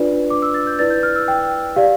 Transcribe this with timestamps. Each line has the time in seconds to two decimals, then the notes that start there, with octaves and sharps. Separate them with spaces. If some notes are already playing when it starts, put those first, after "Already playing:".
Already playing: D4 F4 B4 D5
0.30 D6
0.42 E6
0.54 A6
0.67 G6
0.79 E4 B4 D5 A6
0.90 G6
1.03 F6
1.16 E6
1.28 G5
1.76 G4 D5 F5